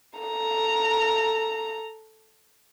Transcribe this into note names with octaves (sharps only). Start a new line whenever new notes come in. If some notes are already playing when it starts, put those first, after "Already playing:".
A4 A#5